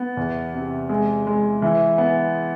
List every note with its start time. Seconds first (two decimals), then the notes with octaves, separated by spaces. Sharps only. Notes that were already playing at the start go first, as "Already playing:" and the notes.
Already playing: B3
0.17 E2
0.54 C3
0.89 G#3
1.27 G#3
1.62 E3
1.98 B3